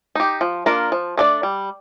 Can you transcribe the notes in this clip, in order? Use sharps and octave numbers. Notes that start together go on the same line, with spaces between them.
D#4 G4
F3
A#3 D4 F4 A#4
F3
A3 D4 A4 D5
G3